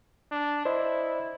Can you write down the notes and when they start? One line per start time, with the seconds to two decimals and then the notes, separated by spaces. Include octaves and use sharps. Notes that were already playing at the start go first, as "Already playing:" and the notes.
0.31 D4
0.65 E4 C5 D5 D#5